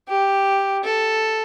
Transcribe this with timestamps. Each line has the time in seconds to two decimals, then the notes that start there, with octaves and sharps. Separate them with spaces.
0.08 G4
0.84 A4